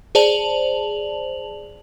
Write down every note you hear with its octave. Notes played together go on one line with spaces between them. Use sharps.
G#4 C5 D5 A5 F7 F#7